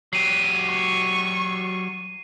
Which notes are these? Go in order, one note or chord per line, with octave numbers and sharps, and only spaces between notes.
F#3 G4 C7 D#7
C#6